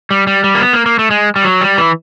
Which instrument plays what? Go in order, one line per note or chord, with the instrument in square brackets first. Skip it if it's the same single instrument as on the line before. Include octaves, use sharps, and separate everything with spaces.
[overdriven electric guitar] G3
G3
G3
A#3
B3
A#3
A#3
A3
G#3
G3
F#3
G3
E3